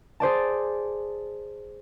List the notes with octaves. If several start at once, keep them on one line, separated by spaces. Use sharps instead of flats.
G#4 C5 D5 A5